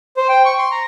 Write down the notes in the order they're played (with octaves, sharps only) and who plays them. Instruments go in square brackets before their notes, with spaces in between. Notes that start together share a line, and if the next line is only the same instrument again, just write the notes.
[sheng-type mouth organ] C5
G5
C#6
C6
A#5